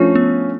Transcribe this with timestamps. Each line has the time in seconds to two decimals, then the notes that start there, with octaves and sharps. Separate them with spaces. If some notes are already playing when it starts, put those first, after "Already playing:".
Already playing: F3 A3 C#4 D4 F4
0.15 B3